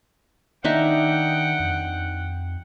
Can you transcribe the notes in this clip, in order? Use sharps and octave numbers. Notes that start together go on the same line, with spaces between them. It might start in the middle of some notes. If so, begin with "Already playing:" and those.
D#3 D4 D#4 E5 F#5 G5
F2